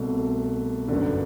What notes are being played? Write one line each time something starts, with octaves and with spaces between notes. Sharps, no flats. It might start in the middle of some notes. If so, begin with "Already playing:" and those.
Already playing: C2 B2 A3
G1 F#2 D3